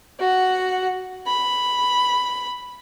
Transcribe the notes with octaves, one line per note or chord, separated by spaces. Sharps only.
F#4 F#5
B5